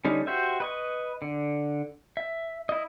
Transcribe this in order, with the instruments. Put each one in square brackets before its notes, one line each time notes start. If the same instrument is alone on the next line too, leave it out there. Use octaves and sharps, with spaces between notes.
[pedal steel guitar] D3 G3 C#4 D#4
F#4 G4 C5 E5
B4 D#5 C#6
D3
E5
E4 D#5